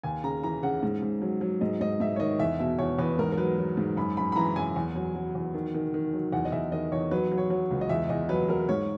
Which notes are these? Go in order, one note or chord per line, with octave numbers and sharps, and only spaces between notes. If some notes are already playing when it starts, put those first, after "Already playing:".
D#2 G#5
C#3 A#5
E3 A#5
C#3 F#5
G#2
G#2
F#3
F#3
G#2 D#5
G#2 D#5
G#2 E5
C#5
D#3 D#5
E2 E5
B2 E5
E2 C#5
E2 B4
G#2 A#4
A#4
F#3 B4
F#3
G#2
F#2 B5
F#2 B5
B5
E3 A#5
F#2 G#5
E2
F#3
F#3
E2
D#3
D#3
D#3
F#3
E2 F#5
D#5
E2 E5
D#3 D#5
E2 C#5
F#3 B4
F#3
C#5
F#3
C#2
D#5
E2 E5
E2 D#5
F#3 B4
F#3 A#4
G#2 C#5